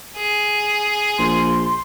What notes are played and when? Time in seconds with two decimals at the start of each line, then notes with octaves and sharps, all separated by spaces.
0.16 G#4
1.19 A#1 C6